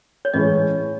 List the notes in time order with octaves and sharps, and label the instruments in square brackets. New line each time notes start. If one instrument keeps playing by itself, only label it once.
[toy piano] C#5
[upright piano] A2 E3 G#3 C#4 [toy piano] D#5